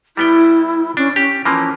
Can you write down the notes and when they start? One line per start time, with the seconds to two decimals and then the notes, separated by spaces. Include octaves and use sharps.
0.17 G3 B3 E4 G5
0.97 C#4 D4
1.16 C#4 G4
1.45 E3 F3 A#3 C#4